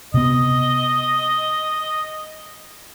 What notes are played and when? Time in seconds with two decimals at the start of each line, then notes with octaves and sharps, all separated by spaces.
0.14 C3 B3 D#5